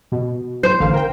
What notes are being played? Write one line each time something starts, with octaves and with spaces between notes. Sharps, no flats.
B2
C5
A1 D3 F5
A#4 G5